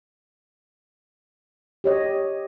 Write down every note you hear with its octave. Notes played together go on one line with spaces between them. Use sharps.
G4 C#5 D#5